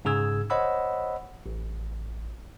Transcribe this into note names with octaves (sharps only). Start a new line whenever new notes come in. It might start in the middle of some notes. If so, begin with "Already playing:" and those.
G#2 C#3 G#4 E6 G#6
C5 C#5 D#5 F#5 B5 E6
A1